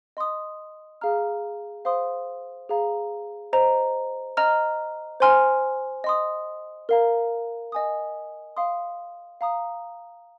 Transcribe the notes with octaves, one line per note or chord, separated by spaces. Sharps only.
D#5 C6 D#6
G#4 F5 A#5 F6
C5 F5 C6 D#6
G#4 F5 A#5
C5 D#5 A#5
D#5 A#5 F6
C5 G#5 C6 F6
D#5 C6 D#6
A#4 F5 A#5
D#5 G#5 D#6
F5 C6 D#6
F5 A#5 D#6